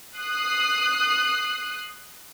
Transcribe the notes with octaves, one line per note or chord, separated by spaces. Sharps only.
D#6 F#6 C7